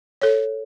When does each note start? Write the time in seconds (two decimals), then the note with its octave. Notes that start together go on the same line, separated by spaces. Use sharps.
0.22 A4 C#5